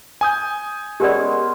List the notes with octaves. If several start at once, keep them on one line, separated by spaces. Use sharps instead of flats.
G#5 D#6 G6
G#3 B3 C#4 G4 A#4 D5